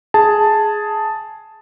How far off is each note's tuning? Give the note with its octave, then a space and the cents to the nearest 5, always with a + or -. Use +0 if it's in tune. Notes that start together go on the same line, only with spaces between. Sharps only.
G#4 +5 A5 +0